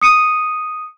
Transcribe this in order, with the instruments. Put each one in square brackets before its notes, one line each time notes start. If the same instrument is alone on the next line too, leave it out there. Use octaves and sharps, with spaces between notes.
[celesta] D#6 C#7 D#7